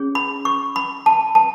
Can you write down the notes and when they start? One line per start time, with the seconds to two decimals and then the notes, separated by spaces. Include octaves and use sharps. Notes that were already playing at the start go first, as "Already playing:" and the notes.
Already playing: C#4 G#4 C#5
0.15 B5
0.45 C#6
0.76 B5
1.06 A5
1.35 A5